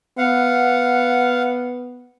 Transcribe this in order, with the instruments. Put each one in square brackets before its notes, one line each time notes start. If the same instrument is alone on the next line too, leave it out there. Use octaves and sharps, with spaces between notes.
[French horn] B3 [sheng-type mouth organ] F5 F#5